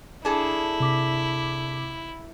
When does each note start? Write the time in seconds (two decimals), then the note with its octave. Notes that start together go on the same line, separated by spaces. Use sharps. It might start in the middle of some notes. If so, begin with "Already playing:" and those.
0.25 D4 E4 G#4 A4
0.80 C3 D6 B6